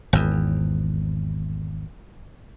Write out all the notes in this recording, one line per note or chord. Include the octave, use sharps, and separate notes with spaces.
G#1 E2